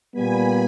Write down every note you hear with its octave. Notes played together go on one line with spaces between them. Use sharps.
A#2 G3 B3 G#5 B5